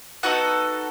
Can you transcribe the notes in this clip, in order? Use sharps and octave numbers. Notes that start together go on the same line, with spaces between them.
B3 D#4 F#4 A4 F#5